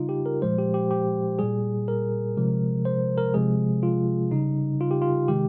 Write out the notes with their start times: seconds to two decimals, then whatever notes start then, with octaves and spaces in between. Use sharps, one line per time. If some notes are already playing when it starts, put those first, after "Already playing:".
Already playing: C#3 G3 D#4 F4
0.09 G4
0.26 A#4
0.42 A#2 F3 G#3 C5
0.59 G4
0.74 G4
0.91 G4
1.39 A#2 G3 G#4
1.88 A#4
2.37 C3 F3 G#3
2.85 C5
3.17 A#4
3.34 C3 F3 G#3 G#4
3.83 F4
4.31 C#3 G3 D#4
4.81 F4
4.91 G4
5.02 F4
5.28 C3 D#3 G#3 G4